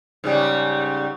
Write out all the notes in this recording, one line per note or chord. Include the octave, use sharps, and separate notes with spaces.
G#2 C#3 G3